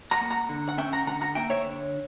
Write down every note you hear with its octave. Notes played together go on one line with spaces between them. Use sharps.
F#5 A#5
A#3
F#5 A#5
D3
F#5
C#4 E5 G5
F#5 A#5
D3 F#5 A#5
F#5 A#5
A#3 E5 G5
C#5 E5
D3